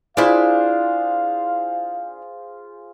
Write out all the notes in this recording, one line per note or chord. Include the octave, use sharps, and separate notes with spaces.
D4 E4 F4 G#4 C5 F5